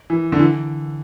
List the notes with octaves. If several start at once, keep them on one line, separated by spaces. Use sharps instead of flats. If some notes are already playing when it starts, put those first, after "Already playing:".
E3
D3
E3